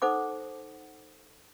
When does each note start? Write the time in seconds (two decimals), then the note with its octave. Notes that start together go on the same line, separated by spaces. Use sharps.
0.02 D#4 A4 C5 F#5 D6